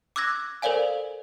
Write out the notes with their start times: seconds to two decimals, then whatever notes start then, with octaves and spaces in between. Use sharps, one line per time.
0.16 D6 E6 F#6 G#6 A#6
0.62 A4 A#4 C5 D5 F5 G#5